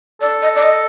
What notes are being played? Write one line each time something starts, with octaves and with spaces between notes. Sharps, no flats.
A4 D5
D#5
D5
D#5